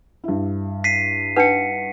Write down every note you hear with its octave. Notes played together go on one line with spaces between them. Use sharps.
G2 E4
B6 C7 D#7
D4 D#4 B4 F#5 C#7